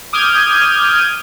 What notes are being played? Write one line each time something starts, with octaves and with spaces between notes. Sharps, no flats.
D6 D#6 F6 G6 G#6 D#7